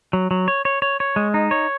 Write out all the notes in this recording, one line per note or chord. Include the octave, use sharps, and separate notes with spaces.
F#3
F#3
C#5
C#5
C#5
C#5
G#3
D#4
C#5